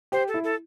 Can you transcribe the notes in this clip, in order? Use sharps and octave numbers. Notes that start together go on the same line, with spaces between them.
G4 C5
A4
E4
A4